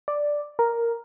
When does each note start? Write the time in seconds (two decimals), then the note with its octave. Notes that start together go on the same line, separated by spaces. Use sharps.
0.08 D5
0.59 A#4